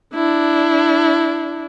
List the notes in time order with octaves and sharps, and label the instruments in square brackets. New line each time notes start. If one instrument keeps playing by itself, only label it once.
[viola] D4 E4